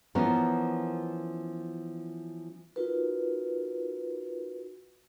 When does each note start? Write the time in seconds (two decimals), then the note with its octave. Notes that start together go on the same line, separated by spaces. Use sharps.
0.15 E3 F3 B3 C#4 A#4
2.76 D#4 F4 F#4 A#4 B4